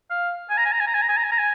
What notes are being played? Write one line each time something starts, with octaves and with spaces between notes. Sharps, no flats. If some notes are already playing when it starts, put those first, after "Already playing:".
F5
G#5
A#5
G#5
A#5
G#5
A#5
G#5
A#5
G#5
A#5
G#5
A#5
G#5